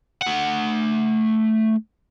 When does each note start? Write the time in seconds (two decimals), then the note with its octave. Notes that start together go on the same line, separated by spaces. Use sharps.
0.22 A3 F#5